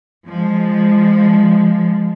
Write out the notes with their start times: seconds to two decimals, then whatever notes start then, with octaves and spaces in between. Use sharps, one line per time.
0.26 F3 G#3